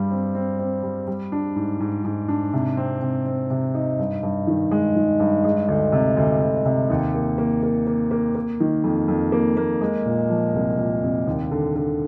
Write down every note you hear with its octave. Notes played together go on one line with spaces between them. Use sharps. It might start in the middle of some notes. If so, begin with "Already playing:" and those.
Already playing: G2 G3
C4
C4
C4
G3
G3
D4
G#2
G#2
G#2
D4
C3
C4
C3
C4
C3
D#4
G2
G2
D#3
G#3
D#3
G2
G#3
D2
C3
D2
D2
C3
D#2
A#3
A#3
A#3
A#3
A#3
A#3
D#3
F2
F2
A#3
A#3
G#3
A#2
F3
C2
A#2
C2
D#2
D3
D3